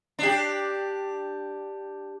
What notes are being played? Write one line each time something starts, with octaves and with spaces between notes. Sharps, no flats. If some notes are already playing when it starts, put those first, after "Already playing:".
D4 G4